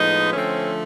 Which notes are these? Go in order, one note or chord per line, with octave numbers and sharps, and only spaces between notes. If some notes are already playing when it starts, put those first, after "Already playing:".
Already playing: A2 F3 G#3 B3 D#4
D3 F3 A3 C4 C#4